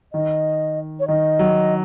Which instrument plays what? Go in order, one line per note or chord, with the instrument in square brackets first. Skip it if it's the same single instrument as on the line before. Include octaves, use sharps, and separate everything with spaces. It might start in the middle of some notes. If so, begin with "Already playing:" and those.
[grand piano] D#3 [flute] D#5
[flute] C#5
[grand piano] D#3 [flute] D#5
[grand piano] F#3